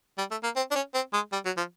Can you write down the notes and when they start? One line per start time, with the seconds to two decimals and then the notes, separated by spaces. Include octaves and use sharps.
0.18 G3
0.31 A3
0.43 A#3
0.56 C4
0.71 D4
0.75 C#4
0.94 C4
1.13 G#3
1.32 G3
1.45 F#3
1.57 F3